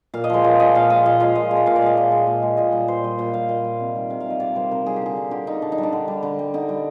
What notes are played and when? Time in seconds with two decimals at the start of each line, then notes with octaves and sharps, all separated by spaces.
0.14 A#2 F5
0.24 D#5
0.30 F3 G#3 C5
0.44 A#2 D5
0.59 F3 G#3 D#5
0.75 A#2 F5
0.90 F3 G#3 D#5
1.05 A#2 D#5
1.20 F3 G#3 F5
1.35 A#2 D#5
1.51 G#3
1.56 D#5
1.66 A#2 F5
1.76 D5
1.82 G#3 D#5
1.97 A#2 D#5
2.11 G#3
2.27 A#2
2.42 G#3
2.57 A#2 D#5
2.72 G3
2.88 A#2 C5
3.04 G3 D#5
3.18 A#2 F5
3.34 G3 F5
3.49 A#2 D#5
3.64 G3
3.80 C3
3.95 D#3 G3
4.10 C3 F5
4.20 F5
4.26 D#3 G3 D#5
4.40 C3 D5
4.55 D#3 G3 C5
4.71 C3 A#4
4.86 D#3 G3 G#4
4.96 G4
5.01 D3 G#4
5.16 G3
5.31 D3 G4
5.47 G3 D#4
5.62 D3 D4
5.72 D#4
5.78 G3
5.83 D4
5.93 D3
6.08 G3
6.23 D3
6.39 G3
6.54 D3 D#4
6.69 G3